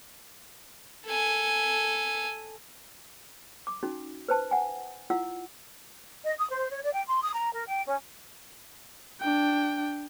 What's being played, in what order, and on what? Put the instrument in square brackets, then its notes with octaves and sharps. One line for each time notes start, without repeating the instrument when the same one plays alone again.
[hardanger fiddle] A4 G#5
[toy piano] D6
C#4 D#4 F#4
B4 C5 A5
F#5 G#5
E4 F4 F#5 E6
[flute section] D#5
D#6
C5
C#5
D5
G5
C6
D#6
A#5
A#4
G5
C#4
[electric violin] D4 G5